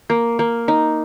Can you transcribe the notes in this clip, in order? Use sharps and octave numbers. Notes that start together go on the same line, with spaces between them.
A#3
A#3
D#4